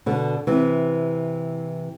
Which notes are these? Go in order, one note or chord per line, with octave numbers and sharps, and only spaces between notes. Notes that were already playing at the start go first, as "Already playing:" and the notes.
B2 D3
C3 E3